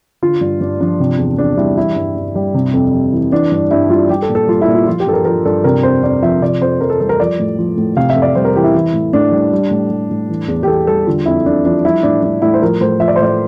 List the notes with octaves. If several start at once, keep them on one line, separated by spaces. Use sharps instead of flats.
D3 F4
G2
G2 D4
F3 D4
C3
E2
E2 D4
G3 E4
E3 E4
G2
G2
G3
C3
F2
G3
E3
E3 D4
G2
G2 E4
G3 F4
G3 G4
A4
A#2
A4
G3 F4
E4
A#2
F4
F3 F4
G4
G2 A4
A#4
F3 A#4
G2 A4
C3 A#4
F2 C5
F2 D5
F3 E5
C3 D5
F2 C5
F2 A#4
A4
G3 A4
A#4
F3 D5
A2
F3
A2
C3 F5
E5
F2
D5
G3 C5
A#4
E3 G4
E4
E3
A2
A2 D4
G3
G3
A2
G3
A2
E3
E2
G4
E2 A4
G3 A4
D3 F4
F2 E4
F2 D4
F3 D4
G3 E4
A2 D4
G3 D4
A2 E4
C5
F3 A#4
A2 C5
F3 E5
D5
C5
A2 D5